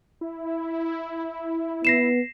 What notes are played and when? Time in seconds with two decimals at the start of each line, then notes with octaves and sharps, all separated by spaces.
0.21 E4
1.85 B3 A#6 C7 E7